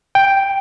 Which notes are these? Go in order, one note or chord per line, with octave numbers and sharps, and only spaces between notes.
G5